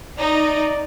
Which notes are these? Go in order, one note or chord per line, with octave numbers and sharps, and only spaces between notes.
D#4 D5